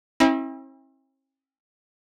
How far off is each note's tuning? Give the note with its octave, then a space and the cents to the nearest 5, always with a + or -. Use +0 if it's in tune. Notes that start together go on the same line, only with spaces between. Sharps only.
C4 +45 E4 -35